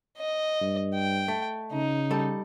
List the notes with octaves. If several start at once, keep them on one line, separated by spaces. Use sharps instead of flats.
D#5
G2
G5
A3
C#3 D#4
G3 A4